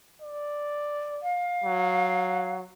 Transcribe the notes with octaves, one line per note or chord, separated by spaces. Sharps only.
D5
F5
F#3